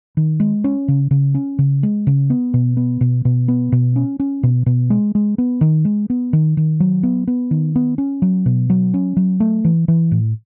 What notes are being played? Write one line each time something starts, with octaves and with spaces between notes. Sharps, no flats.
D#3
G#3
C#4
C#3
C#3
C#4
C#3
G#3
C#3
B3
B2
B3
B2
B2
B3
B2
C#4
C#4
B2
B2
G#3
G#3
B3
D#3
G#3
B3
D#3
D#3
F#3
B3
B3
D#3
B3
C#4
F#3
B2
F#3
C#4
F#3
A3
E3
E3
A2